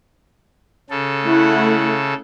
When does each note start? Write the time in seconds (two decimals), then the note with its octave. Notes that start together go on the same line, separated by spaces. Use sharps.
0.90 C#3 A4
1.23 A3 E4 F#5